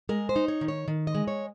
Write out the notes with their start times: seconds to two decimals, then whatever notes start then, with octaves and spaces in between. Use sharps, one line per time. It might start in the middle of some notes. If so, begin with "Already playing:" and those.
0.09 G#3 A#4
0.29 C5
0.36 D#4
0.48 C#5
0.61 D#3
0.68 C#5
0.88 D#3
1.07 D#5
1.15 G#3
1.28 C#5